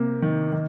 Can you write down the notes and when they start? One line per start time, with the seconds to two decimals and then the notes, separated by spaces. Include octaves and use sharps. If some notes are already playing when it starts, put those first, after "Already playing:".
Already playing: C3 A#3
0.22 D#3
0.52 D#3